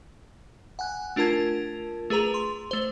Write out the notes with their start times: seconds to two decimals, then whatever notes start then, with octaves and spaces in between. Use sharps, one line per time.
0.79 F#5 G#5 F#6
1.16 A3 D4 F4 A#4 A5 G#6
2.10 A3 G#4 B4 A#5 F7
2.34 C6
2.71 A3 C5